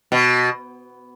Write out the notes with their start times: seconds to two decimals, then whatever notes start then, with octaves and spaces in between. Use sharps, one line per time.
0.12 B2